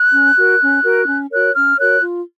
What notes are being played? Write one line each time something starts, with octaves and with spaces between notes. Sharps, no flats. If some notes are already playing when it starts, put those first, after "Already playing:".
Already playing: F#6
C#4
F#4 A#4
C#4
F#4 A#4
C#4
F#4 A#4 C#5 F#6
C#4 F6
F#4 A#4 C#5 F#6
F4